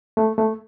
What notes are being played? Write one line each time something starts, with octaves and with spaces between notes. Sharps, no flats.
A3
A3